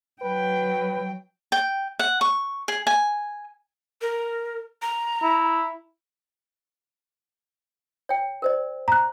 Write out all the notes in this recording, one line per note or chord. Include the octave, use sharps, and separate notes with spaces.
F#3 B4 G5
G5
F#5
C#6
G#4
G#5
A#4
A#5
E4
C#5 G5
A#4 C5 D5
A#5 F#6